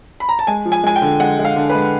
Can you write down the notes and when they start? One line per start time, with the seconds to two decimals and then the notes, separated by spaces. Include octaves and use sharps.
0.20 B5
0.29 A#5
0.39 A5
0.47 G#3 G#5
0.65 F3
0.72 G#5
0.84 G#3 G#5
0.96 G5
1.02 D3
1.20 G#3 F#5
1.39 G#3
1.45 F5
1.56 D3
1.70 B4
1.75 G#3